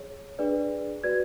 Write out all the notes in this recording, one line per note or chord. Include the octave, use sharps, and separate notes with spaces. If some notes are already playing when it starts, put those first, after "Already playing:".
Already playing: G#4 C#5
D4 G#4 B4 D5
F#4 B4 D5 G#6